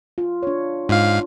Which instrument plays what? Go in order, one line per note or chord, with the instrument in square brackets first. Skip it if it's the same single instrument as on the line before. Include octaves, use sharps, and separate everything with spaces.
[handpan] F4
D4 C#5
[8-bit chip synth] G#2 F5 [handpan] D4 F4